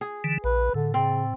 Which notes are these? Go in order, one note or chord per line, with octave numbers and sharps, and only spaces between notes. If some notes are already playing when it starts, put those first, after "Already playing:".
G#4
D3 E3
A#1 B4
A2 D3
C#3 C4